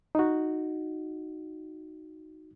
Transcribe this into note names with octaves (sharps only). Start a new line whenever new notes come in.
D#4 F#4